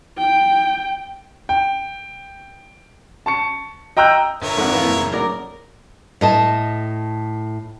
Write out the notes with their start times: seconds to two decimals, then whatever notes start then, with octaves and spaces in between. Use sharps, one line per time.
0.18 G5
1.49 G5
3.26 A5 C#6 C#7
3.97 D#5 G5 A#5 E6 F#6 G6
4.42 D3 A#4 B4 C#5 E5
4.58 G#1 F2 F#5
4.72 F2 E3 F#4 B4 F5
4.84 F#2 A#2
4.96 C#3
5.13 A2 F#3 A#4 D5
6.21 A2 D#5 A5